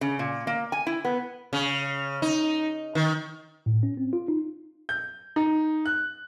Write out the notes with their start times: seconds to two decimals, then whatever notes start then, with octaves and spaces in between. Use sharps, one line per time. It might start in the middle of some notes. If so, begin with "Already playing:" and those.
0.01 C#3
0.19 A#2
0.47 A#3
0.72 G#5
0.87 E4
1.05 B3
1.53 C#3
2.22 D#4
2.95 D#3
3.66 A2
3.83 C#4
3.97 C4
4.13 F4
4.28 D#4
4.89 G6
5.36 D#4
5.86 F#6